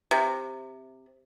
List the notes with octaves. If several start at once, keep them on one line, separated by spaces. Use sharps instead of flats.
C3